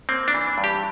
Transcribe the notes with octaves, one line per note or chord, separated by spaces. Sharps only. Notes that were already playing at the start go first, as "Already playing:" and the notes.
A#3 C4
D4
E3
G2
G4